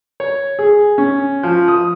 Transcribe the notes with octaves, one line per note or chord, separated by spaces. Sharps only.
C#5
G#4
C#4
F3
D#6